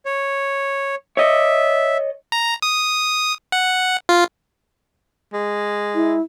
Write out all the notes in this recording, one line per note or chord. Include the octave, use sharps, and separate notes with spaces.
C#5
C#5 D#5 E5
A#5
D#6
F#5
F4
G#3
E4